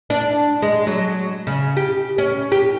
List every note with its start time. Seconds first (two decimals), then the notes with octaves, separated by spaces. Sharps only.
0.10 D4
0.62 G#3
0.87 F#3
1.47 C#3
1.77 G4
2.18 C#4
2.52 G4